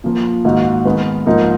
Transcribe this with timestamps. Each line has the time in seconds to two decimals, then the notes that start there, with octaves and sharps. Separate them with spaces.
0.04 A#2 F3 A#3
0.45 G#2 D#3 A#3 D#4 F#4
0.85 D#3 G#3 B3
1.26 G#2 F3 A#3 D#4 A#4